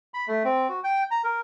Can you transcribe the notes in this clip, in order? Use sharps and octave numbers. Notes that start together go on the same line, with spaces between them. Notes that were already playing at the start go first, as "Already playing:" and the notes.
B5
A3
C4
F#4
G5
A#5
A#4